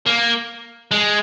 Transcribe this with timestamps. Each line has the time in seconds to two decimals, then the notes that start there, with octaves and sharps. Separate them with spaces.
0.06 A#3
0.91 G#3